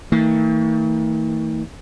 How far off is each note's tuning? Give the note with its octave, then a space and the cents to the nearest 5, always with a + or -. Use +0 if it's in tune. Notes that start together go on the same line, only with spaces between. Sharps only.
D#3 +45 A3 +45